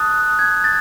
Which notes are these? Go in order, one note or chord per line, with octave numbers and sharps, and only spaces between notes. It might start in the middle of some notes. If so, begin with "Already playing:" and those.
Already playing: A5 D#6 F#6 A6
G#6
A6